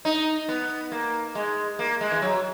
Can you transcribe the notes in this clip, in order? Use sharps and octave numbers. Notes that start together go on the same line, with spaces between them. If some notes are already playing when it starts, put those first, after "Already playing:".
D#4
B3
A#3
G#3
A#3
G#3
E3
F#3